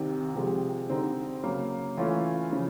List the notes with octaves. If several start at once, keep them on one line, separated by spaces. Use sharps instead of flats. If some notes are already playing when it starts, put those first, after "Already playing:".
Already playing: C2 C3 D#3
C3 F3 G#3
D3 G3 C4 D#4
C#3 F#3 A#3
E3 A3 C#4 F4
C#3 F3